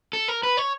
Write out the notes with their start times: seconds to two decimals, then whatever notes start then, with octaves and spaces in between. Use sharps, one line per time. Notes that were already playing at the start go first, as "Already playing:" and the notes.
0.13 A4
0.28 A#4
0.43 B4
0.57 C#5